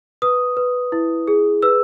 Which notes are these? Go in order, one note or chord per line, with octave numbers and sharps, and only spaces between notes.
B4 D#6
B4
E4
G#4
B4 E6